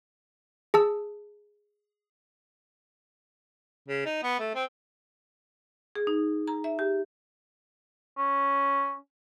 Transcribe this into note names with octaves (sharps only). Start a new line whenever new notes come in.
G#4 A5 E6
C#3
D#4
B3
A3
C4
G#4
D#4
A#5
E5
G4
C#4